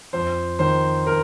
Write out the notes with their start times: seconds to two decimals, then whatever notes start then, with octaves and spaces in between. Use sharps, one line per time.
0.13 F2 C5
0.59 D#3 C5
1.07 A#4